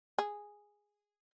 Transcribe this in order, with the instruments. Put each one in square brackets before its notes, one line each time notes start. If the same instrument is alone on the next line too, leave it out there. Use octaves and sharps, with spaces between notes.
[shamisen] G#4